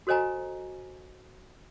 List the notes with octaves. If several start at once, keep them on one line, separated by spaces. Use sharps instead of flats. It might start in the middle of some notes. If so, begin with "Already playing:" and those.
F#4 A4 C5 D#5 G#5 A#5